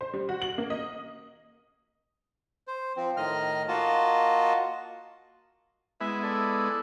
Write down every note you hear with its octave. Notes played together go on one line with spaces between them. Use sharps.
C5
G3
F#4
F#7
A#3
D#5
C5
F3 C4
A2 D#3 D#5 F6
A#3 F4 F#4 D#5 A5
G#3 B3 E4 E5
A4 D5